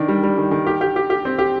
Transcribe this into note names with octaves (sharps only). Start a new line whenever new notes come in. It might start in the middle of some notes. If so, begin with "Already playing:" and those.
Already playing: D#3 D4
G3
G3
D#3
D#3
G4
G4
G4
G4
C4
G4